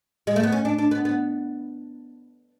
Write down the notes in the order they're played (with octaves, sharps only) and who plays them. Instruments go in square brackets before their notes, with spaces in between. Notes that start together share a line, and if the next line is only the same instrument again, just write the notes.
[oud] G#3
A3
B3
C#4
D4
D4
B3
B3